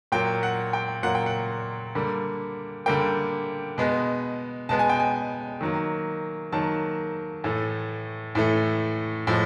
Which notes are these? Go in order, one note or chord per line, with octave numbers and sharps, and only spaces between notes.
A#2 F#3 A#3 G5
F#5
G5
A#2 F#3 A#3 F#5
G5
F#5
D3 G3 A#3
D3 G3 A#3 G5
B2 G#3 B3
B2 G#3 B3 A5
G#5
G5
G#5
D#3 F#3 A#3
D#3 F#3 A#3 A5
A2 E3 A3
A2 E3 A3
A2 F3 G#3